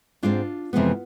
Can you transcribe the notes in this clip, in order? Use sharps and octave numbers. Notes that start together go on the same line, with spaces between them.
G#2 G#3 C4 D4 F4
F2 C3 E3 G#3 B3